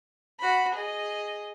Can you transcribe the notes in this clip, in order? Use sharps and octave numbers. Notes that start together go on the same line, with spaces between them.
F#4 B5
G#4 D#5